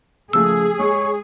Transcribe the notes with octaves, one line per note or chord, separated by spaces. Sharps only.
C#3 F3 A3 G#4 E6
G#3 C#5